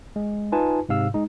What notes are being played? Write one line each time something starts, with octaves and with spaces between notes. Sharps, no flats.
G#3
D#4 F4 B4 G#5 A5
G#2 C3 F5 E6
G#3 D#4